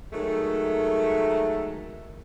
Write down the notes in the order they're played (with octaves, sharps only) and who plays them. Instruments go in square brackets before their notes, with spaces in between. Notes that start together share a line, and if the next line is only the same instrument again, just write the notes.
[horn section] D#3 F#3 G#3 A3